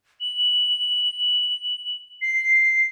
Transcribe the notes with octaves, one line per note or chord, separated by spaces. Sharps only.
F#7
C7